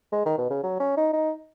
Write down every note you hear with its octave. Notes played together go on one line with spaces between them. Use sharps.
G#3
D#3
B2
C#3
F#3
C#4
D#4
D#4